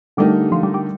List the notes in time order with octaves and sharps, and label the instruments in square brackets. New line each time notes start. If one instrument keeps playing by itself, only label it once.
[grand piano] D3 A3 D#4 G4 A#4 [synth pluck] G3
[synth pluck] F3
G3
G3